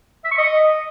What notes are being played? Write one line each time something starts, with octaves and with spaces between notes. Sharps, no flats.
E5
C#6
D#5